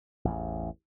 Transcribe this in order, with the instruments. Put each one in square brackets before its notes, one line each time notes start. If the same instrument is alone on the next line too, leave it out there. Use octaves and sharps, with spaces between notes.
[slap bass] A1 E2